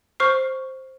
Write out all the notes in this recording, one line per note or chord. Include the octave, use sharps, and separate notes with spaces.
C5 C#6 F6 C7